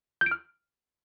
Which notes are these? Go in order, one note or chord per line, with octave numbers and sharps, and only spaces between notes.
G6
D7
F6